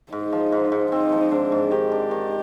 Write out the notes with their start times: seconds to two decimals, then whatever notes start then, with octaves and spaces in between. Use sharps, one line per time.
0.12 G#2 D#4
0.32 F3
0.52 G#2
0.72 G#2
0.92 C4 D#4
1.12 F3
1.31 G#2 D4
1.52 G#2
1.71 D#3 G4
1.92 D4
2.11 D#3